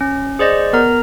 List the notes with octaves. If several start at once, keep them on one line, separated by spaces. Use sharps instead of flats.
C#4
G#4 C5 D5 D#5
B3 A#4 A#5